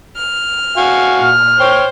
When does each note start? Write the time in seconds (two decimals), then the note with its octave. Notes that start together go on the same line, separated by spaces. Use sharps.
0.17 F6
0.77 F#4 F5 G#5
1.19 A#2 F6
1.60 C5 C#5 G5